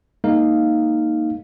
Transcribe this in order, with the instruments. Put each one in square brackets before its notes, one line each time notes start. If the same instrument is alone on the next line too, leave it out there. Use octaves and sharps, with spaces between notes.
[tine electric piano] G#3 A#3 D#4 A#4 F5